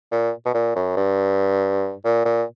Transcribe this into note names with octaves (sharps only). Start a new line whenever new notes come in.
A#2
B2
A#2
F#2
G2
A#2
A#2